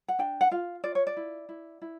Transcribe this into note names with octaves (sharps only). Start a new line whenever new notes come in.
F#5
D4 G5
F#5
F4 F5
F4 D5
C#5
D5
E4
E4
E4